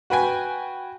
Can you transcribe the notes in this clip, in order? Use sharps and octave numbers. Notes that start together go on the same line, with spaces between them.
F#4 B4 G5 G#5